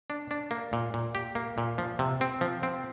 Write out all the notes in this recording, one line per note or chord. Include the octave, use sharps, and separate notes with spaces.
D4
D4
A#3
A#2
A#2
G4
A#3
A#2
F3
C3
C4
F3
C4